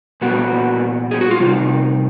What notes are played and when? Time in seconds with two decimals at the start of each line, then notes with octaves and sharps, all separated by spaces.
0.22 A#2 G3 B3 F#4
1.11 G#4
1.21 F#4
1.31 F4
1.40 C3 D#3 G3